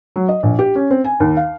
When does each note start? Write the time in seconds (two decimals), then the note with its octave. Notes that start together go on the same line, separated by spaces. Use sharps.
0.16 F#3
0.29 D#5
0.43 A#1
0.59 G4
0.75 C#4
0.90 C4
1.04 G#5
1.20 D#2
1.37 F5